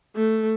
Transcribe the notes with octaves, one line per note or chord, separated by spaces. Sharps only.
A3